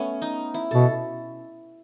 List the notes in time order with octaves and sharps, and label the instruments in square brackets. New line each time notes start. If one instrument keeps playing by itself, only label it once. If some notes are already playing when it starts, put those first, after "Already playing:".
Already playing: [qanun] A3 B3 C#4
D#4
E4
[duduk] B2 [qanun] A4